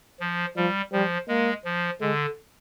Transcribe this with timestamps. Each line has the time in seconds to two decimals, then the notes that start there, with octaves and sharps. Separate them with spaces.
0.20 F3
0.56 F3 G3
0.92 F3 G3
1.28 G#3 A#3
1.65 F3
2.01 D3 G#3